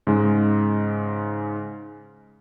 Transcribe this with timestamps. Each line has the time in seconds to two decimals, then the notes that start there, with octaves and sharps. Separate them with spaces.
0.07 G#2 C#3 G#3